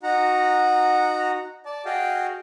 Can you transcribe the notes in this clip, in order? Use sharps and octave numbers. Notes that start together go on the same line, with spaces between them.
D#4 F#4 F#5 A#5
D5 A5
F#4 G#4 D#5 F5 G5